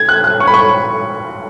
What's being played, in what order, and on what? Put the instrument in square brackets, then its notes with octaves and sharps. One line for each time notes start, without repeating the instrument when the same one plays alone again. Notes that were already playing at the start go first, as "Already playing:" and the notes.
Already playing: [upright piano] G#6
F#6
F#6
C#6
B5
C#6